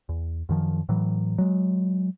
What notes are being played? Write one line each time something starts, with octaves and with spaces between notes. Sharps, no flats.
E2
F#2 D#3 F3
A2 E3 F#3
F#3 G#3